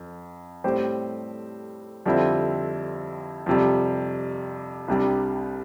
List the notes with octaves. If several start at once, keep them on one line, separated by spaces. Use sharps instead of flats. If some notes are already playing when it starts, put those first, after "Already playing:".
Already playing: F2
A2 G3 C4 G4 C5
F2 D3 G3 C4 E4
F2 C3 G3
C2 C3 G3 D4